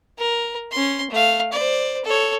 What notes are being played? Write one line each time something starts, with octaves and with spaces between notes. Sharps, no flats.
A#4
C#4 C6
A3 F5
C5 D5
A4 C#5